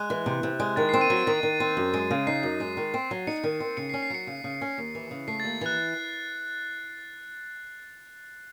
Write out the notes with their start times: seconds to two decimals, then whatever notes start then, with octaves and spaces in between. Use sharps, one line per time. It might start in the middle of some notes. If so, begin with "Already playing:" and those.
Already playing: G#3 F#6
0.10 E3
0.26 C3
0.43 C3
0.60 G#3
0.76 D#3 A6
0.89 C4 C7
1.01 D#7
1.10 F#3 A6
1.26 D#3 A6
1.43 D#3
1.60 C4
1.77 F#2
1.93 G#3
2.11 C#3
2.27 D#4 C7
2.43 F#2
2.60 G#3
2.77 D#3
2.94 C4
3.11 F#3
3.27 D#4 C#7
3.44 D#3
3.60 C4
3.77 C#3 C#7
3.89 C7
3.94 C#4
4.03 C7
4.10 F#3 C#7
4.27 C#3
4.44 C#3
4.61 C#4
4.78 D#2
4.95 E3
5.11 C#3
5.28 A3 C7
5.40 D#2 A6
5.61 E3 F#6